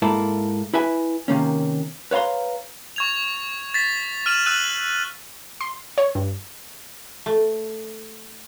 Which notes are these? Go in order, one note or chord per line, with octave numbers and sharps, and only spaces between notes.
G#2 A#3 E4 A4
E4 B4 E5 G#5
C3 D#3 A#3 C#4
B4 C#5 F5 A#5 C6
C#6 G#6 F7
A6 B6
F6 D#7 E7 F#7
E6 F#6 D#7 F#7
C6
C#5
G2
A3